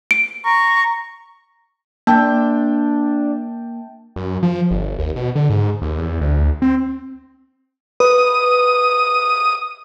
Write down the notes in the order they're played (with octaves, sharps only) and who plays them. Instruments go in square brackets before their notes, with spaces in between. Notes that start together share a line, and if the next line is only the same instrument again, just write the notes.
[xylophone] D7
[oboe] A#5 [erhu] C#6
[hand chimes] A#3 [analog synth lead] D4 [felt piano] G5 A5
[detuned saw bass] F#2
F3
G1
D#2
B2
D3
G#2
D#2
E2
D2
C4
[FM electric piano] B4 [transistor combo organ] D#6